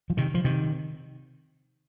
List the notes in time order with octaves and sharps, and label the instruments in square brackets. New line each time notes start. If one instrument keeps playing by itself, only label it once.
[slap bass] F3
C3 D#3
F3
C3 D#3